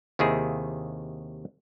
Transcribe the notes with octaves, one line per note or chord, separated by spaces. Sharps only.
D#2 C3 D#3 E4 G#4